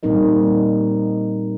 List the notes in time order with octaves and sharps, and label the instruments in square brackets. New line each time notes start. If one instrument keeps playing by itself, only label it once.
[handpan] A#2 G3 C4 D#4 A#4 D#5